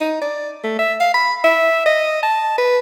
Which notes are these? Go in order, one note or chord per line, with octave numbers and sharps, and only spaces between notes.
D#4
D5
A3
E5
F5
B5
E5
D#5
A5
B4